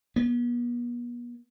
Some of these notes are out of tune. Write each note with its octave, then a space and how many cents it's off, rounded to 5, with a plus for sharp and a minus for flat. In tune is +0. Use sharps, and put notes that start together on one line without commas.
B3 -40